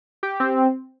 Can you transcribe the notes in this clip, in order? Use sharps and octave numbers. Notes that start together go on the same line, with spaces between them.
G4
C4